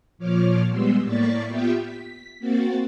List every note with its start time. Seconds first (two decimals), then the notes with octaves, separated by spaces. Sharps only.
0.18 A#2 F3 C#5 D6 F6
0.69 G3 G#3 B3 C6 E6
1.05 A2 A#3 D5 C#6 A6 B6
1.47 B3 F4 G4 E5 G5
1.81 B6
2.39 A#3 C4 F#4 A6